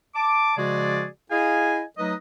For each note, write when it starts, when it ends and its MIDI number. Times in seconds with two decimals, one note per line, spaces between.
0.15 0.54 81
0.15 0.54 86
0.57 1.06 49
0.57 1.06 53
0.57 1.06 56
0.57 1.06 66
0.57 1.06 68
0.57 1.06 74
1.31 1.82 64
1.31 1.82 68
1.31 1.82 75
1.31 1.82 77
1.31 1.82 80
1.98 2.14 54
1.98 2.14 57
1.98 2.14 63
1.98 2.14 71
1.98 2.14 75